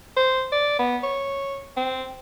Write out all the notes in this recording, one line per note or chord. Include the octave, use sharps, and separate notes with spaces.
C5
D5
B3
C#5
C4